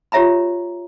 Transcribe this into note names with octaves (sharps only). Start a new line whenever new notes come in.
F4 G4 C#5 E5 A#5 B5